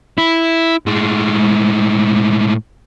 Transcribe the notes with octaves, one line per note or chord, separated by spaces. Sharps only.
E4
A2 G#3